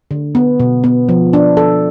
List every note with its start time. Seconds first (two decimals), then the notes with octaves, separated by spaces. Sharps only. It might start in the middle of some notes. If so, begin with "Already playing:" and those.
0.11 D3
0.35 B3
0.60 B2
0.84 B3
1.09 F3
1.33 D4
1.57 A4